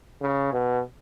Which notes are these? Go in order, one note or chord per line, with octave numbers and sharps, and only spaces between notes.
C#3
B2